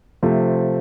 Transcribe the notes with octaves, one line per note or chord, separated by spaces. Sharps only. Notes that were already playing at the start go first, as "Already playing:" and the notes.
C3 F3 A3